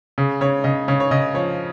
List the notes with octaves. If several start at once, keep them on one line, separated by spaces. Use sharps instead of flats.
C#3 G#4
C#3 C#5
C#3 D#5
C#3 C#5
C#5
C#3 D#5
F3 C#5